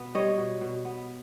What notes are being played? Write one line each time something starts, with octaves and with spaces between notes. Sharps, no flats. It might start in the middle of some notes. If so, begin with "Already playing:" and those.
Already playing: B2 B3
G3 C#5 D#5
B2
B2
B3